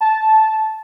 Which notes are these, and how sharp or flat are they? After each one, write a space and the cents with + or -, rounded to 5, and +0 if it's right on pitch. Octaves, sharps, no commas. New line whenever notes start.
A5 -10